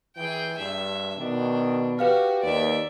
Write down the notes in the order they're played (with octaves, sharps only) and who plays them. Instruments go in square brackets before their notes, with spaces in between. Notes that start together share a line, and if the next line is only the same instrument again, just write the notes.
[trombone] E3 [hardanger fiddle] G#4 G5
[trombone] G2 [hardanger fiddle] E5
[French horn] B2 [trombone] D#3 [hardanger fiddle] D4
[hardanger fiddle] F#4 [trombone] G4 [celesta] B4 F5 F6
[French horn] D#2 [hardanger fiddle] D5 E5